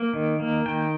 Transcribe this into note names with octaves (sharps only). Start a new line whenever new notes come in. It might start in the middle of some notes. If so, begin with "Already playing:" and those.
Already playing: A#3
D#3
A#3
D#3 G5